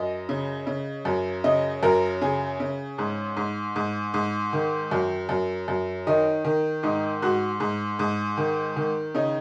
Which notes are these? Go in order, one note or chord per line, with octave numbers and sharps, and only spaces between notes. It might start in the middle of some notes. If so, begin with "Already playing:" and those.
Already playing: F#2 D#5
C#3
C#3
F#2
C#3 D#5
F#2 A#4
C#3 G#4
C#3
G#2
G#2
G#2
G#2
D#3
F#2
F#2
F#2
D#3 D#4
D#3
G#2 D#4
G#2 F#4
G#2
G#2
D#3
D#3
C#3 D#4